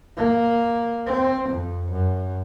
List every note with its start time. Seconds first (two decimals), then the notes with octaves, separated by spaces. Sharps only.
0.17 A#3
1.07 C4
1.49 F2
1.92 F#2